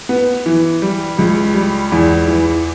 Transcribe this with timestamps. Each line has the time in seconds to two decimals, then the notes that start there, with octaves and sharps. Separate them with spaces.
0.09 B3
0.46 E3
0.82 G3
1.18 C#2
1.55 G3
1.92 E2
2.28 E3